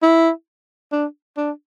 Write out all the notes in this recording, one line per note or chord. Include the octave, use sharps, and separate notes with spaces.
E4
D4
D4